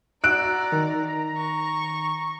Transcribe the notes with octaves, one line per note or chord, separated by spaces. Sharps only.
F#4 D5 A#5 E6 F#6 D7
D#3
C#6